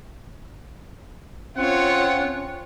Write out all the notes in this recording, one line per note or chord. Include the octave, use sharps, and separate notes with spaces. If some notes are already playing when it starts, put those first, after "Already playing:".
C4 C#4 F4 C#5 F#5